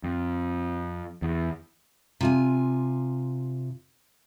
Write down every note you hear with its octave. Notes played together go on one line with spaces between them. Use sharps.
F2
E2
C3 F4 G#5